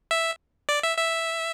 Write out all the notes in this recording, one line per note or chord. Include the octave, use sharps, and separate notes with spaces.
E5
D5
E5
E5